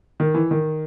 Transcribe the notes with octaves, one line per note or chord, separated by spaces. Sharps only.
D#3
E3
D#3